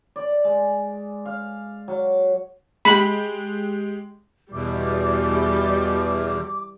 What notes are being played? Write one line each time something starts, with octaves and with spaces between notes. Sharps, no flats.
D5
G#3
F5
F#3
G#3 G4 B5
E2 B2 E3 G3 D6